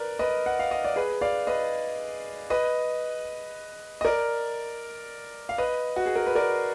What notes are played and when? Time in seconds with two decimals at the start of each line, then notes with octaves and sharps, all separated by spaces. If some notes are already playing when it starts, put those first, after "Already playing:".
Already playing: A#4 B4 D5
0.19 B4 D#5
0.46 F#5
0.59 F5
0.71 D#5
0.85 D5
0.96 G#4 B4
1.21 D5 F5
1.47 B4 D#5
2.50 B4 D#5
4.01 D#5
4.05 A#4 D5
5.49 F5
5.58 B4 D#5
5.96 F#4
6.06 G#4
6.16 A#4
6.27 B4
6.35 A#4 D5